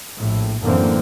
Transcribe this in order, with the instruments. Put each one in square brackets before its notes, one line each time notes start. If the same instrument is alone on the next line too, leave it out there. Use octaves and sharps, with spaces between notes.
[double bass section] A#1 A2
F#2 A2 D3 E3 A#3 C4